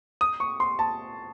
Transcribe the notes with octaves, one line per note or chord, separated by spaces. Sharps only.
D#6
C#6
C6
A5